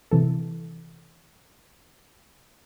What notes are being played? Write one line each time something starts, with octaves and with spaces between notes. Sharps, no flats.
C3 E3 A4